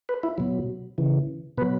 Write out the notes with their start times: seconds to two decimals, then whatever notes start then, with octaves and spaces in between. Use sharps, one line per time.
0.09 B4
0.23 E4
0.38 B2 F#3
0.98 C#3 E3
1.58 B2 B4
1.61 F#3